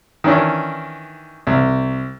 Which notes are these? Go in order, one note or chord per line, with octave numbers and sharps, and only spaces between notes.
D#3 E3 C#4 D4
C2